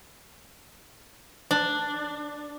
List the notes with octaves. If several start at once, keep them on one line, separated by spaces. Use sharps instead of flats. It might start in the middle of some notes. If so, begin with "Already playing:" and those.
D4